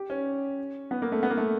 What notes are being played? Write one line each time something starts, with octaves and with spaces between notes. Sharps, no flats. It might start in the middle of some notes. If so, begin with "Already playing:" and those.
Already playing: G4
C#4
B3
A#3
A3
B3
A#3
A3